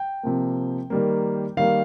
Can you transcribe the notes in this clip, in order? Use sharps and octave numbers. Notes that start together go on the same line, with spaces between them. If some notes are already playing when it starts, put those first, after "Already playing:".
Already playing: G5
C3 F3 A#3
D#3 G3 A#3
D#3 G3 A#3 F5